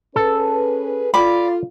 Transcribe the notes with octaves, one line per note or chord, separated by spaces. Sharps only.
C#4 G#4 A4 B4
F4 D5 B5